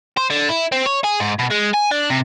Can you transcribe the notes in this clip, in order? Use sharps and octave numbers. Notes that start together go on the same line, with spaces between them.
C5
D3
E4
C4
C#5
G#4
G#2
B2
G#3
G#5
D4
C3